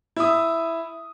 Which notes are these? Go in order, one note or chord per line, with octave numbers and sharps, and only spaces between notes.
E4 E5 D#6